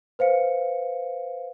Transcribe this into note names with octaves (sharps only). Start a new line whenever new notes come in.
B4 C5 F5 C#7